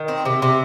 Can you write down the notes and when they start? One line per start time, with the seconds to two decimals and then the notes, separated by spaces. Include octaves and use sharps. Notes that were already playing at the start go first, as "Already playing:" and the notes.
Already playing: D#3
0.08 C4
0.25 C3
0.42 C3